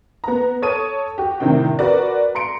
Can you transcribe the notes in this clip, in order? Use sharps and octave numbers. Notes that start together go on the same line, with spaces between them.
B3 A#5
A4 C#5 A5 D#6 D#7
F#4 G4
A2 C3 D#3 D4 G5
F#4 A#4 B4 D5
A#5 C6 C#7 D7